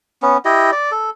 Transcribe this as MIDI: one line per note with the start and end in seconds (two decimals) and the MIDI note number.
0.22 0.37 59
0.22 0.37 61
0.45 0.71 64
0.45 0.71 67
0.45 0.71 75
0.72 0.92 74
0.92 1.10 69